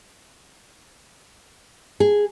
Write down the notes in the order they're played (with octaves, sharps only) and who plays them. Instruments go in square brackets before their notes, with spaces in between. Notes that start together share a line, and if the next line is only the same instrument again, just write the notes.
[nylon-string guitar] G#4